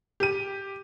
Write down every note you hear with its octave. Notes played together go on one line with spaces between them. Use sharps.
G4 D#7